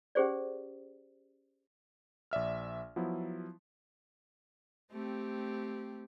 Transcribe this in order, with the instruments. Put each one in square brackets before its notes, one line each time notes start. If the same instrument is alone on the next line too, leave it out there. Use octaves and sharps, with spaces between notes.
[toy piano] C#4 G4 G#4 C5 D5
[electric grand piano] A#1 D5 E5 F6
F3 F#3 B3 E4
[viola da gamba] A3 C4 G4